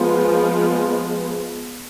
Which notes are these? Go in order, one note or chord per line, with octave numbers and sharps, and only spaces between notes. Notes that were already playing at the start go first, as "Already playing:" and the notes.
Already playing: F3 G#3 B3